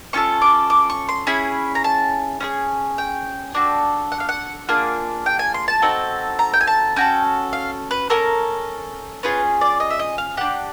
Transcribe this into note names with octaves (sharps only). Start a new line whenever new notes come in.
C#4 F4 A4 C#6
D6
D6
C#6
C6
C#4 E4 G#4 B5
A#5
A5
C#4 F4 G#4
G5
D4 F#4 A4
F#5
F5
F#5
A#3 D4 F4 G#4
G5
G#5
C6
A5
C4 D#4 F#4 A4
A#5
G5
G#5
A5
C#4 F#4 A4 G5
F5
B4
C#4 F#4 A4 A#4
C#4 F4 G#4 B4
D5
D#5
E5
D#5
F5
D4 G4 F#5